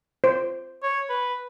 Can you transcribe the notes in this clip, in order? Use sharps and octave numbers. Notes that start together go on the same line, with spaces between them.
C5
C#5
B4